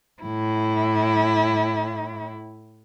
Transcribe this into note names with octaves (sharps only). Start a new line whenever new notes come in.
A2 E4